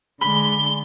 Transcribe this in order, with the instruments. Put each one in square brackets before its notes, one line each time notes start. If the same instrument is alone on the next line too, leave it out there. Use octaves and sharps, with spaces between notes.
[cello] D3 G#3 [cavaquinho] B5 [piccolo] G7